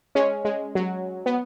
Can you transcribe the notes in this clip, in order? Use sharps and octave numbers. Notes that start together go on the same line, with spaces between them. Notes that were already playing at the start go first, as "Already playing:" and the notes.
G#3 C#4
G#3
F#3
B3